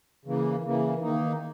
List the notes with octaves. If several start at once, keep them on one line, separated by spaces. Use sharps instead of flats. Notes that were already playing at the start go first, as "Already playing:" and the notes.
C#3 E3 A#3
C#3 E3 A#3
D#3 A#3 D#4